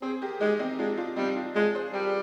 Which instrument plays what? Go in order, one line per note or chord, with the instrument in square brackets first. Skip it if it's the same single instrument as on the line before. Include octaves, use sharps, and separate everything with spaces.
[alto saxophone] C4 [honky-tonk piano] G#4 C5
[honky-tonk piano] G4 A#4
[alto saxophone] G#3 [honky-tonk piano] D#4 G4
[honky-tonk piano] C4 D#4
[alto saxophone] G#3 [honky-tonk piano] D4 F4
[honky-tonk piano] D4 F4
[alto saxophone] G3 [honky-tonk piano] C4 D#4
[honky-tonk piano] D4 F4
[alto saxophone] G#3 [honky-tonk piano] D4 F4
[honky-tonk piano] G#4 C5
[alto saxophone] G3 [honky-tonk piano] G4 A#4